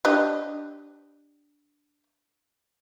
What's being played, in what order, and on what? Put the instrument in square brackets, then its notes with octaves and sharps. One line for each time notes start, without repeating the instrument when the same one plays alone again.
[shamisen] D4 G4 D#5